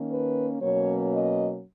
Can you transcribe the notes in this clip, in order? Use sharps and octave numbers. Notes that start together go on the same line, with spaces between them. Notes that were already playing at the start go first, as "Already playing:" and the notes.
Already playing: D#3 A#3 C#4
B4
B2 F#3 A#3 C#4 C#5
D#5